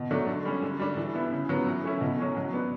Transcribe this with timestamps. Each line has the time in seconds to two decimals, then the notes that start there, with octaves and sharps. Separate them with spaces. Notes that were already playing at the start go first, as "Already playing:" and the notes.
Already playing: B2
0.11 F#3 A3 D4
0.28 D3
0.45 G3 C#4
0.62 D3
0.79 G3 D4
0.97 E3
1.14 B3 E4
1.31 C#3
1.49 F#3 B3
1.67 E3
1.83 A3 C#4 E4
2.01 B2
2.19 F#3 C#4
2.37 F#3
2.53 B3 D4